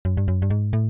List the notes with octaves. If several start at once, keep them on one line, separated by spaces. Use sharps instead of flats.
F#2
G2
F#2
G2
G#2
A2